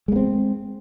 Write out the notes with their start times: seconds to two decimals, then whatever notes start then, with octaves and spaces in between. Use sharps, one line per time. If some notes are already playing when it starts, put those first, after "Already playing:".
0.08 G#3
0.12 A#3
0.16 C4